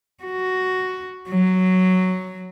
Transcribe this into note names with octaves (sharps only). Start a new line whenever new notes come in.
F#4
F#3